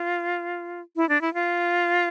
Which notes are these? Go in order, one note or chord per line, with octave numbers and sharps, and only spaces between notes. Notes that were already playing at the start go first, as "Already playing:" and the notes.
Already playing: F4
E4
D4
E4
F4